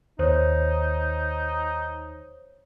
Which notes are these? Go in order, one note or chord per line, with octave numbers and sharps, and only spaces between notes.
D#2 D#4 C5 C#5